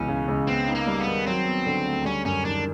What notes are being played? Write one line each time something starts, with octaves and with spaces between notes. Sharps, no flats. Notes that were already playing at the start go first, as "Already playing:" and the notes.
Already playing: C#2 B2 E3 C#4
C#3
C#2
B3 C4
D#4
A#3
G3
B3
D#3
F#3 C4
B3
D3
D2
G3 C#4
F#2 C#4
D#3 D4